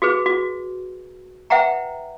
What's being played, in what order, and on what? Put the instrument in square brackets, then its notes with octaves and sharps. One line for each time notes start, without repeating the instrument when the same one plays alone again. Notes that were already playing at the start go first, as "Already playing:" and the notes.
[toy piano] F#4 G#4 B4
F#4
B4 E5 F#5 G5 A#5